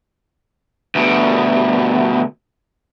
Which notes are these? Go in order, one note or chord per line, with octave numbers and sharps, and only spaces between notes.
D2 B2